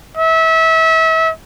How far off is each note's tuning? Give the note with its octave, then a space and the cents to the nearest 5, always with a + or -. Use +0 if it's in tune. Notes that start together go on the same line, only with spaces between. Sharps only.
E5 -30